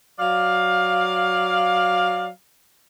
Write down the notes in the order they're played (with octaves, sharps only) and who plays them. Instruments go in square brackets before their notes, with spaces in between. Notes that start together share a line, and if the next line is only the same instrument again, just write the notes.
[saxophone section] F#3 D5 F5